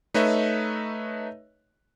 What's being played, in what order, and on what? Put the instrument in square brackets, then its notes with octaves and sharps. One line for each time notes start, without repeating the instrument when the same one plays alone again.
[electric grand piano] A3 D#4 B4 C#5 D#5 E5